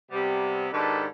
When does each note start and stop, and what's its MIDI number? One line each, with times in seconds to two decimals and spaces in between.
0.11 0.68 48
0.11 0.68 55
0.11 0.68 59
0.73 1.06 44
0.73 1.06 51
0.73 1.06 62
0.73 1.06 67
0.73 1.06 69
0.73 1.06 71